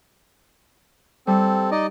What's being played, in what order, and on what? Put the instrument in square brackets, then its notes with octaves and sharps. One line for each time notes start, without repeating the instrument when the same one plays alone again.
[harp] G3 [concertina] C4 A4
[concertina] D#4 D5 D#5